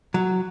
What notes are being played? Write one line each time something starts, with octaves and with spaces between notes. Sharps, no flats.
F#3